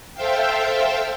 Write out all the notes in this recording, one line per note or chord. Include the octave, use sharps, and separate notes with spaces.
A4 C5 E5 F5 G5